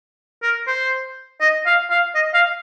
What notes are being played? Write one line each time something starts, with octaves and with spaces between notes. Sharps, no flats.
A#4
C5
D#5
F5
F5
D#5
F5